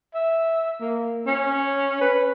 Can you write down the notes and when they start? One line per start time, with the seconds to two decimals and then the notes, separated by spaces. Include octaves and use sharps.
0.14 E5
0.81 A#3
1.27 C#4
2.01 B4